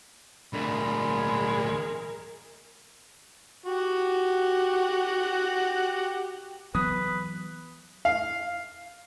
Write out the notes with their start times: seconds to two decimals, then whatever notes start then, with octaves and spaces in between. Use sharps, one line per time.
0.54 D2 A#2 G#3 A#4 B5
3.66 F#4 G4 F#5
6.75 E3 F#3 B3 B4 D#6
8.05 F5